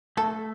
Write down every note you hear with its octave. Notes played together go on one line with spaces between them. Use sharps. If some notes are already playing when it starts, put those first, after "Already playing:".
A3 A4